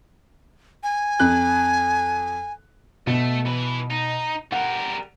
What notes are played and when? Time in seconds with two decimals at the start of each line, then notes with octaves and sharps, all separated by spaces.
0.83 G#5
1.20 F2 F#6
3.07 B2 A3
3.46 E3 B4
3.90 D#4
4.52 G3 A#4 F#5